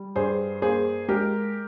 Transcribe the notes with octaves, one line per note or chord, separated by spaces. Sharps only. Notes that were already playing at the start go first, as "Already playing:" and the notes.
Already playing: G3
G2 G#4 C5
A#3 G#4 C5
G#3 G4 A#4